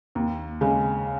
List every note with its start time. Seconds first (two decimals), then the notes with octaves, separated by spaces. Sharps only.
0.15 D#2
0.61 C#3 G#3